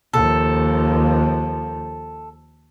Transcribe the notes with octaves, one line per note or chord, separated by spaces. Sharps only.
D#2 F3 A4